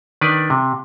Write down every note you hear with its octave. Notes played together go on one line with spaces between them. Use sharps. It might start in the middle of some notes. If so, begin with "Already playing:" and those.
D#3 D4 B4 D5
C3